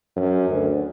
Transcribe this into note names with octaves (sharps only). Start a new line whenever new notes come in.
F#2
D2